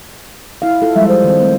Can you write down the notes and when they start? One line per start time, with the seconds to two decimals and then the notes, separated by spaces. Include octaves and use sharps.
0.62 E4 F5
0.82 E4 F4 A4
0.96 F3 G3 G#3 E5
1.08 C5
1.24 D#3 C4
1.37 G3 A3 C4